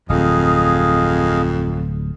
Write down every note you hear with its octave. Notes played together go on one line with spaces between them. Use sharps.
D1 F2 G#4 D#5 F5